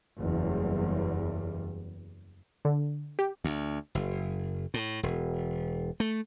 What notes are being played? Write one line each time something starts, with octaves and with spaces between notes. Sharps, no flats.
F#1 E2 G3
D3
G4
D2
F#1
A2
E1
A3